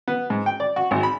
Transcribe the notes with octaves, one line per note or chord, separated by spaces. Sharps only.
B3
G#2
G5
D5
F#4
G#1
B5